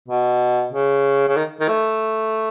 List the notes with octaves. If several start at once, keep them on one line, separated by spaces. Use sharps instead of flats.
B2
C#3
C#3
D#3
D#3
A3